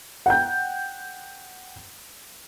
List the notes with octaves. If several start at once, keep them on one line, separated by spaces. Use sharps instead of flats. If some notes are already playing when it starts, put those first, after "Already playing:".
F#5 G5 G6